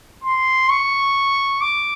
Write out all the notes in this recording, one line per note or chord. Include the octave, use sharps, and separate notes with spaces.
C6
C#6
D6